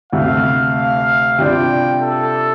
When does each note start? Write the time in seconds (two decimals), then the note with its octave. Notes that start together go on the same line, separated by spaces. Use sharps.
0.12 D2 C3 A3 F5
0.76 F5
1.39 C3 G3 D4 F4 D5 G5
2.02 A4